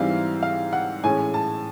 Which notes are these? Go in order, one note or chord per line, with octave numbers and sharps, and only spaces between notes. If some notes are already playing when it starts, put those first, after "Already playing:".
Already playing: G#2 E3 G3 C4 F5
F5
F#5
A2 E3 G#3 C#4 G#5
A5